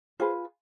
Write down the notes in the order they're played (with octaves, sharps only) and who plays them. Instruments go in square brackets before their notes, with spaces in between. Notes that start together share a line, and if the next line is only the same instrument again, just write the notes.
[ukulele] F4 G#4 B4 C5